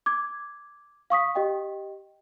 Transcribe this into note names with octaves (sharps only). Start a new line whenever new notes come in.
D6 G#6
F5 C#6 D#6 B6
G4 D#5 G5